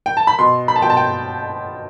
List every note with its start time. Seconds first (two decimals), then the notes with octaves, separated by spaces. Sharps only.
0.06 G5
0.17 A5
0.27 B5
0.39 B2 C6
0.68 B5
0.76 A5
0.82 B2 G5
0.90 A5
0.97 G5